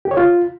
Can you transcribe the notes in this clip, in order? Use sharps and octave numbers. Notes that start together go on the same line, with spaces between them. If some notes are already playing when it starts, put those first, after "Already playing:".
G4
C#5
F4